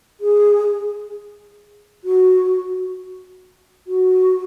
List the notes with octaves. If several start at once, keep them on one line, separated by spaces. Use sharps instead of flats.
G#4
F#4
F#4